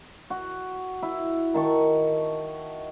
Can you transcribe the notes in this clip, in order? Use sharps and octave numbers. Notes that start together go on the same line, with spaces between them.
F#4
E4
D#3 A5 C#6